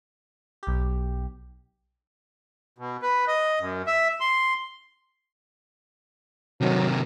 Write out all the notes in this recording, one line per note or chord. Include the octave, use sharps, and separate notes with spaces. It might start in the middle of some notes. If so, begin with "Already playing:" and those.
B1 G4
B2
B4
D#5
F#2
E5
C6
C3 D#3 F#3